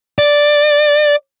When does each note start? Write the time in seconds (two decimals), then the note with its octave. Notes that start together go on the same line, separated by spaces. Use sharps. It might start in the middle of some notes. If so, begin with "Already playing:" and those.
0.19 D5